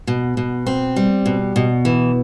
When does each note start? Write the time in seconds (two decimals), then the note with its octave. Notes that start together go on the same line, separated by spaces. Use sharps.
0.07 B2
0.37 B2
0.66 C4
0.96 G3
1.26 B2
1.56 B2
1.85 E3